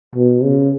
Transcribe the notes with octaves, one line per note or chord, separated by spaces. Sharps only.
B2
C#3